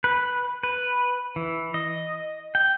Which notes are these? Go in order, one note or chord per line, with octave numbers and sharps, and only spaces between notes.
B4
B4
E3
D#5
G5